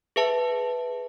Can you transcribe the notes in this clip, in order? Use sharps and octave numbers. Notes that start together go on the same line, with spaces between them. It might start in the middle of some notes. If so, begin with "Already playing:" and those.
G#4 B4 E5 A5